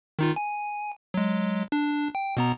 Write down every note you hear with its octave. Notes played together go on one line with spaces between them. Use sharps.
D#3 D#4 F4
G#5
F#3 G#3
D4
G5
B2 B3 A#5